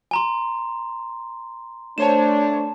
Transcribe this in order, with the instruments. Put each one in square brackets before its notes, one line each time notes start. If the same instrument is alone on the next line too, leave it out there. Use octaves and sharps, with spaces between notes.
[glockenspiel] G#5 A#5 C6
[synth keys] A3 C5 C#5 [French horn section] D4 [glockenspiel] A5 E7